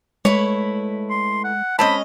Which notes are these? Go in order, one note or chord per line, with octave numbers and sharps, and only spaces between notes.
G#3 A3 E4 B4 C#5
C6
F#5
G#3 C4 C#4 D#5 A5 B5